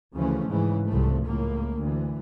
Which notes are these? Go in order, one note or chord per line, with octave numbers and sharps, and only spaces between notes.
D2 C#3 E3 F3 A3 C#4
G#2 C#3 E3
C2 F3 A3
C#2 A2 A#3
D2 E3